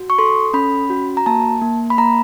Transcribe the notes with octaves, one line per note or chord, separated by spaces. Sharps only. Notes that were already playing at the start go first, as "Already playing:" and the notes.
Already playing: F#4
C#6
A4 C6
C#4 B5
F#4
A#5
A#3 A5
A#3
B5
A#3 A#5